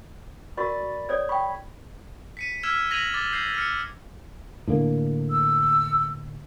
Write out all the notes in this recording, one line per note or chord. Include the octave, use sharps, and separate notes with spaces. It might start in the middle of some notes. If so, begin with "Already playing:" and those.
F#4 A#4 D5 B5 C#6 A6
A4 C#5 D5 G#6
G5 B5 C#6
B6 C#7 D#7
E6 F6 G#6 B6 E7
G#6 A#6 B6 D#7 F7 F#7
D6 A6 G7
G6 C7
F6 C#7
A2 D3 A#3
E6